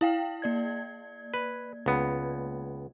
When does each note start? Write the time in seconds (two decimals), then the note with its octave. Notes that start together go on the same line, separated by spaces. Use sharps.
0.01 E4 F5 G5
0.42 A#3 D5 G#6
1.34 B4
1.86 C#2 B3